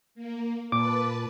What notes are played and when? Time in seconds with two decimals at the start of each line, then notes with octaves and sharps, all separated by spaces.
0.15 A#3
0.72 A#2 B4 A5 D6